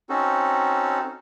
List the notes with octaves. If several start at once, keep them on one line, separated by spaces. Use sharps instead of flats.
C4 C#4 D#4 F#4 A4